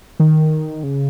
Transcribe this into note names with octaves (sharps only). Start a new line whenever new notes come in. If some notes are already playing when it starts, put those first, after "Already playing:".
D#3
C#3